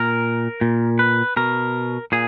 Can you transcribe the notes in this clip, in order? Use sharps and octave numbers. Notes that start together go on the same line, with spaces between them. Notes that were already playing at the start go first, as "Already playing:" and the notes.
Already playing: A#2 A#4
A#2
B4
B2 A#4
A#2 G#4